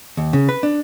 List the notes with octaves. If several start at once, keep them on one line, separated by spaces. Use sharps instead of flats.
D#2
C#3
B4
D4